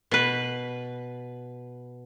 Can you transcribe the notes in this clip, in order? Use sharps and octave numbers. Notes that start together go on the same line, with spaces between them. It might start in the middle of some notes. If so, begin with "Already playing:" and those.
B2 B4